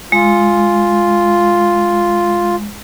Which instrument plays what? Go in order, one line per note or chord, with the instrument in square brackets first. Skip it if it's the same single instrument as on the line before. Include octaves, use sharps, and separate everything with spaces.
[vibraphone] G#3 [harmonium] F4